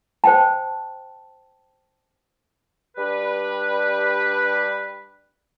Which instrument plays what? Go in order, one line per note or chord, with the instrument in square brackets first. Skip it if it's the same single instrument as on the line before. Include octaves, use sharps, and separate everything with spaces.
[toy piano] C5 G5 A5
[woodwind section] G3 D4 G4 B4